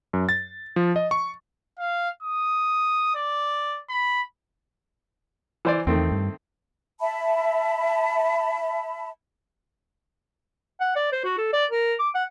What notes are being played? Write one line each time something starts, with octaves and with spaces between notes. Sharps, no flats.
F#2
A6
F3
D#5
C#6
F5
D#6
D5
B5
E3 C5 D5
E2 D#3 A3 C4
G2
E5 A5 B5
F#5
D5
C5
F#4
A4
D5
A#4
D6
F#5